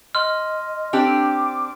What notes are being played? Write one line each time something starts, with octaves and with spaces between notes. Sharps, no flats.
D#5 C6 F6
C4 D4 G4 D6